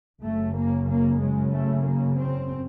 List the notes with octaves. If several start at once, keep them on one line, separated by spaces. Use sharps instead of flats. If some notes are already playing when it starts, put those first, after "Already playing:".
F#1 F#2 C#3 A3
A#3
A#3
G#3
A3
A#3
C4